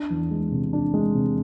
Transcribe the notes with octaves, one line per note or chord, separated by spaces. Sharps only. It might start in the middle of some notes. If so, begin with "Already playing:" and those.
Already playing: D4
E2
G#3
C3
D4
G#3
C3